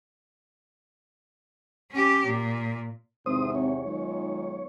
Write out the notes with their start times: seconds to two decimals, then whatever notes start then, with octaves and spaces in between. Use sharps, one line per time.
1.92 C#4 G4
2.26 A#2
3.26 G#1 E2 C3 C5 D#6
3.55 C#5
3.86 B1 D#3 G#3 F4